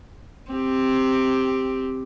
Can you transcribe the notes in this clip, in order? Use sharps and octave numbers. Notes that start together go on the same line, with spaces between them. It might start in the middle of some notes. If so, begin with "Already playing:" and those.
C4 G4